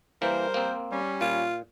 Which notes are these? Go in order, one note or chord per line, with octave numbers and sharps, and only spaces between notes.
E3 G3 A#3 A#4 C5
A#3 C4
G3 C#4
A#2 F4